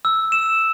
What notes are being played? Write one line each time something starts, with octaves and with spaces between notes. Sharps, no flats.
E6
E7